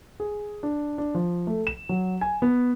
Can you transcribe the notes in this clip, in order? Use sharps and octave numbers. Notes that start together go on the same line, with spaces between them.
G#4
D4
D4
F3
A3
E7
F#3
G#5
B3